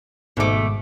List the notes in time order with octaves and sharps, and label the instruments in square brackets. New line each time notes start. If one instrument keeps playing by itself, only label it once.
[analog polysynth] G#1 G#2 D6 [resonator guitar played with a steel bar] B2 A3